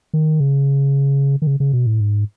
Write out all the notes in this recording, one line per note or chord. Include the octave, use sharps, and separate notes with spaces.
D#3
C#3
D#3
C#3
C#3
B2
A2
G#2